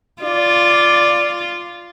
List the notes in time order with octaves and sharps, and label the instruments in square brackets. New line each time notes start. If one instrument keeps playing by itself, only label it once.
[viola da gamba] F4 [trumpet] D5